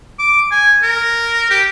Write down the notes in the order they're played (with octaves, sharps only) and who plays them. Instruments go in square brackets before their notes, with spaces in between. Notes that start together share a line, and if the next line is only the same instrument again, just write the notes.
[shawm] D6
G#5
A#4
G4